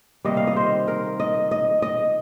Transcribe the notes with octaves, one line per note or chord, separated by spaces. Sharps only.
C3 D#3 G3 A#3 D#5
F5
D#5
C5
A#4
D#5
D#5
D#5